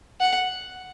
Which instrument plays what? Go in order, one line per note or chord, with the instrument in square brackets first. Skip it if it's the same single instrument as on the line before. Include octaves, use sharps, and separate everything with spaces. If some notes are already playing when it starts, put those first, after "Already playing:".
[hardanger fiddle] F#5